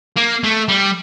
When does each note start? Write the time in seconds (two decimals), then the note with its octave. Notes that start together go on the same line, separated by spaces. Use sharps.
0.17 A#3
0.44 A3
0.68 G3